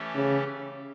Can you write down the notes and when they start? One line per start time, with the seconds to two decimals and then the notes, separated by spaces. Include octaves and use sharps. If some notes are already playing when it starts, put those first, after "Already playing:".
Already playing: E3 A3 C#4 G4
0.15 C#3